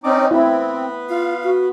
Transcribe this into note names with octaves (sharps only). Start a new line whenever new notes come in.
C4 C#4 D#4 D5 D#5 D6
B3 C4 E4 B4
F4 F5
F#4